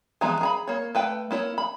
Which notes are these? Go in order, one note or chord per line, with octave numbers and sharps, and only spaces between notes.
E3 F3 G#3 B3 A#5
G#4 A#5 B5
A#3 C#5
A3 B4 G5
A#3 E4 C#5
B5